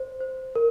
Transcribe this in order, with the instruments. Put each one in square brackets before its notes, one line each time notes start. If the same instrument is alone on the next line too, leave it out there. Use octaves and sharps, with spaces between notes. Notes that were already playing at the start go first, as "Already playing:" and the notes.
Already playing: [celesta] C5
C5
A#4